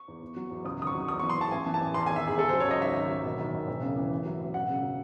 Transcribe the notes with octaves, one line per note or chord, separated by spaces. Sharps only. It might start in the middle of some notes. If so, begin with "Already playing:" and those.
Already playing: C#6
E2
E2
F#3
E2
C#2 D#6
D#3 D#6
C#6
F#3
E2 D#6
E3 C#6
C6
E2 A5
A1 G#5
E3
A5
A1
E2 C6
D#3 G#5
E5
E2 G#4
C#2 A4
F#3 C5
C#5
C#2 D#5
G#1 E5
D#3
F#3
E1
D#3
E1
E1
C#3
E3
A1
F#3
A1
E1 F#5
C#3
F#3